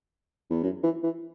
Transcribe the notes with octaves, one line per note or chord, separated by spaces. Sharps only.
E2
F#2
E3
E3